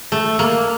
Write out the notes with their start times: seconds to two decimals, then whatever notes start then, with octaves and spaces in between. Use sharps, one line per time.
0.12 A3
0.39 A#3